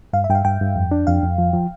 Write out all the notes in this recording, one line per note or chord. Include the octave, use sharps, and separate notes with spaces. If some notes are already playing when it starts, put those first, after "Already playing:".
G2 F5
E5
G2 G5
F5
G2 G5
G2
F2
D4
F2 F5
F2
F3
F3